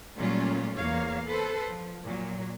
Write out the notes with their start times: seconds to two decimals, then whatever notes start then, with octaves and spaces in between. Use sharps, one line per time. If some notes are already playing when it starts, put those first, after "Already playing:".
0.17 A#2 F#3 G3 A3 C#4 F4
0.77 E2 A#3 C#5 F5
1.26 A4 B4 C5
1.69 F3
2.03 A#2 F#3